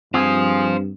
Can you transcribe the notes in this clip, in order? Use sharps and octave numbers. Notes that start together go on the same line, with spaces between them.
G2 C4 F4 G#4 C5 F5